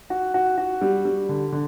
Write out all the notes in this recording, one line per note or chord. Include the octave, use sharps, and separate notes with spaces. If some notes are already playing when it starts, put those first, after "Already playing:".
F#4
F#4
F#4
G3
G3
D3
D3